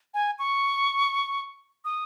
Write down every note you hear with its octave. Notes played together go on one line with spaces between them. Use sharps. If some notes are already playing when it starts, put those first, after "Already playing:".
G#5
C#6
D#6